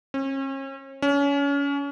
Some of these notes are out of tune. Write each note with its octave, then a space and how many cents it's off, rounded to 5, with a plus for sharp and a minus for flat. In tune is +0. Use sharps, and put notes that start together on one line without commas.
C#4 -40
C#4 +30